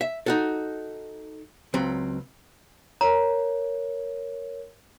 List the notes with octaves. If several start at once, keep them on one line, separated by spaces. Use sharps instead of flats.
E5
D#4 F#4 A4
C#2 F#3 C4
A#4 C#5 A#5